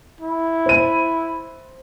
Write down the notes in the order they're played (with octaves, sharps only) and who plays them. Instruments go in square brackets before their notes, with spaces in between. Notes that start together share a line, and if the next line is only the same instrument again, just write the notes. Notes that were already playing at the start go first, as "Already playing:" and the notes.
[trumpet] E4
[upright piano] C5 D#7